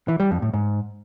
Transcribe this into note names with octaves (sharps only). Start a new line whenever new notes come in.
E3
G3
F2
A2
G#2